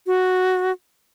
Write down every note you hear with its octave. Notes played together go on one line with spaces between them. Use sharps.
F#4